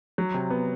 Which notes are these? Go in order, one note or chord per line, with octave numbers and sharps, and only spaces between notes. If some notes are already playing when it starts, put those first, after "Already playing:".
F#3
C3
B3